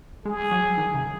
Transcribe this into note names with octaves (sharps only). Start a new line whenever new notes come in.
G#3 G#4
F#3
D#3
C#3